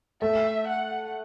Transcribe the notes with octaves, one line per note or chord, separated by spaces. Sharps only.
A3 E5
F#5